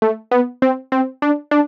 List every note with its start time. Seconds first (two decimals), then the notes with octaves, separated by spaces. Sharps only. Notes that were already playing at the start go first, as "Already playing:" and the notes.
0.02 A3
0.31 B3
0.62 C4
0.92 C4
1.22 D4
1.51 D4